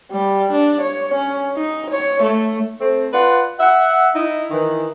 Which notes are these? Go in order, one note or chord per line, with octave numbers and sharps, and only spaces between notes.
G3
D4
C#5
C#4
D#4
C#5
A3
A3 C4
F4 B4 D5 F#5
E5 F#5
D#4 E4
D#3 E3